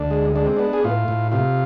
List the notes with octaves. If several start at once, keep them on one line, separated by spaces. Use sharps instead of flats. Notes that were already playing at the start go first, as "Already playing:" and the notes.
Already playing: D2 D4
G#3
G#3 D4
C4
B3 D4
G#4
A2 F4
A2
C3 F4